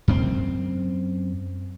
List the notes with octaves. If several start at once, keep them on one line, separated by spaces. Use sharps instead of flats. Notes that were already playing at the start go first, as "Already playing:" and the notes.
F#2 C4